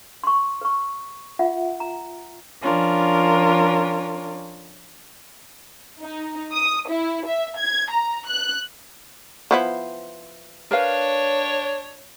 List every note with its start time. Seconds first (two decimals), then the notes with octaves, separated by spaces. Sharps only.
0.24 C6 C#6
0.61 B4 C#6
1.39 F4 E5 F#5
1.80 A#5
2.62 F3 C#4 D4 F4 A#4
6.01 D#4
6.53 D#6
6.88 E4
7.26 E5
7.57 G#6
7.91 A#5
8.28 F#6
9.51 F3 B3 E4 C5
10.71 D4 A#4 B4 C#5 F5